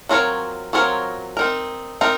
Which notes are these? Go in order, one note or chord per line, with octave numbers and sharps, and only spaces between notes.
F#3 C4 F4 A#4 C#5
F#3 C4 F4 A#4 C#5
C4 D#4 A#4
C4 D#4 A#4